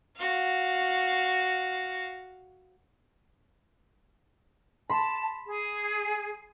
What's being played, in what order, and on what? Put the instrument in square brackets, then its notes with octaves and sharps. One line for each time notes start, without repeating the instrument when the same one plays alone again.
[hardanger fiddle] F#4 F5
[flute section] A5 [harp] B5 C6
[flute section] G#4